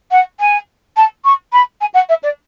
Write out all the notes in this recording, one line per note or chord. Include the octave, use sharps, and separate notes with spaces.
F#5
G#5
A5
C#6
B5
G#5
F#5
E5
D5